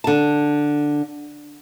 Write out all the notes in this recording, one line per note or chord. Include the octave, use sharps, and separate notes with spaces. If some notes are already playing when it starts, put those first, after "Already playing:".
D3 A5